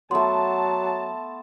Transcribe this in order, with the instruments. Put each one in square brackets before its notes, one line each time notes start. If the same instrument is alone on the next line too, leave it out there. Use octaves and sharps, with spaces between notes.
[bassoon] F#3 [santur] A3 B3 [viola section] A5 [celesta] C6